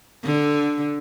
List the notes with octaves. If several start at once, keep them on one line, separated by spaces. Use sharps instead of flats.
D3